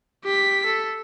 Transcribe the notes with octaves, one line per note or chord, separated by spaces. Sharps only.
G4 B6
A4